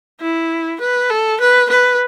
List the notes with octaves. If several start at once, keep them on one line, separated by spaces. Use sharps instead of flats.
E4
B4
A4
B4
B4